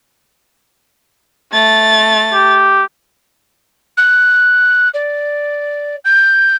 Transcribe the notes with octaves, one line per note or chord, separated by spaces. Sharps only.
A3 A6
G4
F#6
D5
G6